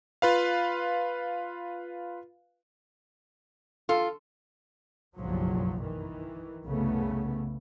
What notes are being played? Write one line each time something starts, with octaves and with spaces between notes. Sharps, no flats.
F4 B4 F5
F4 A4
F#1 B1 G2 F3 F#3
D#3 E3
C2 F#2 C#3 A3 B3